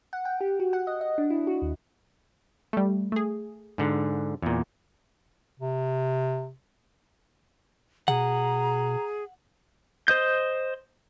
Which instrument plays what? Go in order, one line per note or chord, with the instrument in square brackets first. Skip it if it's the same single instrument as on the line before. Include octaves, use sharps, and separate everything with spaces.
[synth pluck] F#5
G5
G4
F#4
F#5
D#5
D#5
D4
E4
F#4
D#2
G3 A3
A3 G#4
[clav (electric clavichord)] G#2 D3
E2 A#2
[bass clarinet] C3
[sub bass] B2 [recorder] G#4 [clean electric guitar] F#5 [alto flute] A#5
[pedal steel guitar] C5 D#5 G6